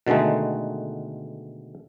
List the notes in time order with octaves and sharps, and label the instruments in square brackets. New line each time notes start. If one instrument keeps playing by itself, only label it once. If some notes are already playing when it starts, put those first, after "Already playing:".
[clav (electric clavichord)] B2 D3 D#3 G#3 A3